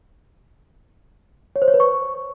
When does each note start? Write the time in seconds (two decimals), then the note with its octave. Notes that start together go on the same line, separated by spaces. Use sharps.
1.56 C#5
1.62 C5
1.68 C#5
1.74 B4
1.80 C#6